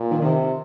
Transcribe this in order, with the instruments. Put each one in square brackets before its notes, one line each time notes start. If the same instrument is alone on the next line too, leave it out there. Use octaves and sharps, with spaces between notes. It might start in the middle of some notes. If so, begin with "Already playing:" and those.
Already playing: [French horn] A#2
[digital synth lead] D#3
[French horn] C3 [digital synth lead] D#3